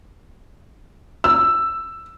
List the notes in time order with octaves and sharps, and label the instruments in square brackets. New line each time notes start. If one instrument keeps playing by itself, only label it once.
[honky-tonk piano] E6